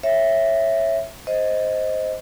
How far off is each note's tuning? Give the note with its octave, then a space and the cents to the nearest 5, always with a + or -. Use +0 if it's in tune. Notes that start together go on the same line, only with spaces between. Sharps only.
C#5 -15 E5 +0
C5 +0 D#5 +10